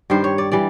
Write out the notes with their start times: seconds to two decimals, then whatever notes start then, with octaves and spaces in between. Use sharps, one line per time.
0.10 G2 D#3 G3 C5
0.24 C#5
0.38 D5
0.52 E3 G3 D5